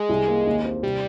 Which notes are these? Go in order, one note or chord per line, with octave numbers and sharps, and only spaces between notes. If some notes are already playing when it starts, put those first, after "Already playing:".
Already playing: G#3
C2
A#3
D#2
C4
C3 G3